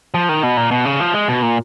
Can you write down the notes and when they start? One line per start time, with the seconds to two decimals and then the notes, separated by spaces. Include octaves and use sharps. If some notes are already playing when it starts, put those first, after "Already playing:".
0.14 F3
0.29 D#3
0.43 B2
0.57 A#2
0.71 B2
0.85 C#3
1.00 F3
1.14 G#3
1.29 B2
1.42 A#2